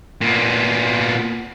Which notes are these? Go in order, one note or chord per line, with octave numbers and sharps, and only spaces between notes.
A#2 B3